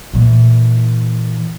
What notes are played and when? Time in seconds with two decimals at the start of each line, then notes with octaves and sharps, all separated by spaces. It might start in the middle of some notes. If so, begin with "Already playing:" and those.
0.14 A#2 E3